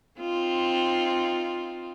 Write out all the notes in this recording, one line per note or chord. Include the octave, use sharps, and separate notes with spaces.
C4 D#4 F4